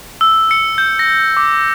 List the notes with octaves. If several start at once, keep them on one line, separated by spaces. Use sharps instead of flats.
E6
C#7
G6
A#6
D6